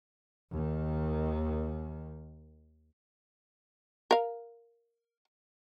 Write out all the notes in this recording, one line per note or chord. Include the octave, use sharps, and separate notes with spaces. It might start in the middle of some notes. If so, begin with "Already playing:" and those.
D#2 D#3
A#4 F5